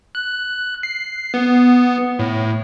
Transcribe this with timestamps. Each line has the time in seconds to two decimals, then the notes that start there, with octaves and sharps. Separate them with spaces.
0.15 F#6
0.83 C7
1.34 B3
2.19 A2